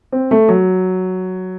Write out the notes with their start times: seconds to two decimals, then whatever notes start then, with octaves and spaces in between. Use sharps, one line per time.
0.12 C4
0.31 A3
0.49 F#3